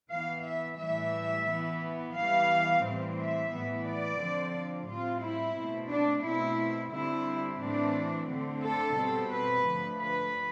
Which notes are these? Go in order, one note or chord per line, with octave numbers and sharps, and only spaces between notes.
E3 B3 F5
E5
A2 E3 G3 E5
E3 B3
E3 G3 B3 F5
A2 E3 G3 C4
E5
A2 E3 B3
D5
D3 F3 C4
A2 G3 C4 F4
E4
B2 A3 C4
D4
B2 A3 C4 E4
D3 G3 C4 E4
A2 E3 A3 C4 D4
D3 A3 C4
A4
B2 G3 C4
B4
D3 F3 A3
B4